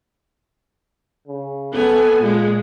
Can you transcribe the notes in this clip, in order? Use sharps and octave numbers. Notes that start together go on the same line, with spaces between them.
C#3
B3 A4 G#5
A#2 G#3 F4